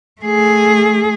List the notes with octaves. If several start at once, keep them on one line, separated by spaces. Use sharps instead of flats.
A3 G#4